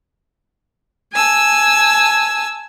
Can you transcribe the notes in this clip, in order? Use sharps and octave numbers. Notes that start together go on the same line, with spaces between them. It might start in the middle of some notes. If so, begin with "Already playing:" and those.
G#5 A5 E6